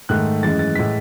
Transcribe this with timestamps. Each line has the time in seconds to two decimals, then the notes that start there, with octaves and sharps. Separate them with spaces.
0.09 G#2 D#3 A3 F#6
0.43 F#2 E3 G#3 A6
0.59 A6
0.75 A2 E3 G#3 B6